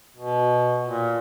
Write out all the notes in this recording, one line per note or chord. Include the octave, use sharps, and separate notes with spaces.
B2
A#2